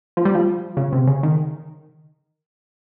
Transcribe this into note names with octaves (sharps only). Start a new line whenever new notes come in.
F3
G3
F3
C#3
C3
C#3
D#3